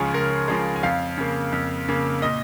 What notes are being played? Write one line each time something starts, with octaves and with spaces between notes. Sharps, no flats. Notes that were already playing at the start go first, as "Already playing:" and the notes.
Already playing: C#2 C#3 F3 G#3 G#4 C#5 F5
C#2 A#4
C#3 F3 G#3
G#5
F2 F5
C#3 A#3
F2
C#3 A#3
A#2 D#5